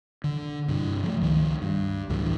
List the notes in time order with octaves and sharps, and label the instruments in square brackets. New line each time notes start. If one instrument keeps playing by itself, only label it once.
[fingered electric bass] D3
G2 C3
F3 G3 A3
C#2 D#3
G2
D2 A2 D3 E3